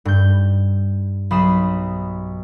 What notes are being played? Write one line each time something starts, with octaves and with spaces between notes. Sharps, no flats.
G2 G6
B1 B5 D#6 C7 E7